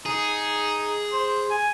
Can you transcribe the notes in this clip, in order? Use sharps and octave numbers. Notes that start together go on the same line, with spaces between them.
D#4 G#4
C5
G#5